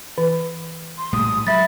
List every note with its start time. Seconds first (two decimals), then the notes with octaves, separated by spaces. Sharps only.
0.18 E3
0.98 C6
1.13 A#1 A2 G3 D#6
1.47 F#3 G#3 E5 B5 A6